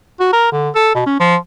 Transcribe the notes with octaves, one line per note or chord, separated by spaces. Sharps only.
F#4
A#4
D3
A4
B2
C#4
F3